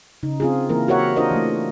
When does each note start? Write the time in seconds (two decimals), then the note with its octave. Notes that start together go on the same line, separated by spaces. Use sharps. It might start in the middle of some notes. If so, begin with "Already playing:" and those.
0.23 C#3 D#4
0.40 C4 F4 G#4
0.69 E3 A#3 E4 A#4
0.88 F#4 G4 A#4 C#5 E5 F#5
1.16 D4 F4 A#4 C5 D#5
1.31 E3 A3